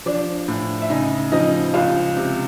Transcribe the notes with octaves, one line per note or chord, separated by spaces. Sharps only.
F3 D4 D5
A2
E5
C#3 D#4 D#5
F3 D#4 D#5
C#2 F4 F5
C3